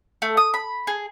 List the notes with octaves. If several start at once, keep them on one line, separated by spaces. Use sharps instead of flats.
A3
D#6
B5
G#4